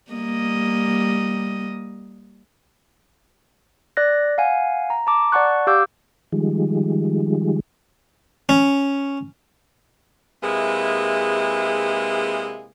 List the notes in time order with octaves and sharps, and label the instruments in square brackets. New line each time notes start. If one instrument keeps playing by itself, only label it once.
[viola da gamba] G3 A#3 D#5
[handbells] D5 F#6 A#6
F5 F#5 G#5
A#5
A5 A#5 D6
D5 F#5 A5 C#6 F#6
G4 F5 D6 E6 G6
[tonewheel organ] D#3 F3 G3 G#3
[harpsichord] C#4
[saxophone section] C3 G#3 A#3 E4 G#4 B4